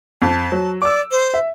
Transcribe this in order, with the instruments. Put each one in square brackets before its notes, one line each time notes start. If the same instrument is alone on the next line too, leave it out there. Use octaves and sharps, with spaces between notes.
[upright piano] F2 [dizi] A5
[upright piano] F#3
[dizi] D5 [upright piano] D6 E6
[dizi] C5
[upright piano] E5